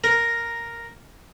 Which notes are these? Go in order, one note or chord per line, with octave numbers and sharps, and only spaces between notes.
A#4